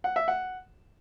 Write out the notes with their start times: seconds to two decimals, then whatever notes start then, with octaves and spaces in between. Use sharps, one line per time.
0.04 F#5
0.16 E5
0.28 F#5